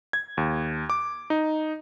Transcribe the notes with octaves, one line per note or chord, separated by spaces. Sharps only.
G#6
D#2
D6
D#4